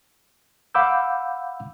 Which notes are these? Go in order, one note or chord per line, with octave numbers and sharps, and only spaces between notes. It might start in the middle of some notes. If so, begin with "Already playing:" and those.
F5 F#5 B5 D6 E6 G6